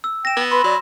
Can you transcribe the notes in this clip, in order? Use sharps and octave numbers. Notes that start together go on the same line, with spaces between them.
E6
G5 A#6 E7
B3
B4 B5 C6
F#3 D5